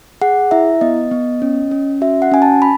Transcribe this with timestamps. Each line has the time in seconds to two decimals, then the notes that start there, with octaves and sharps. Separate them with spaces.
0.21 G#4 F#5
0.51 E4 E5
0.81 B3 D#5
1.11 B3
1.42 C#4
1.71 C#4
2.01 F#4 E5
2.22 F#5
2.31 C#4 G#5
2.42 A5
2.62 B5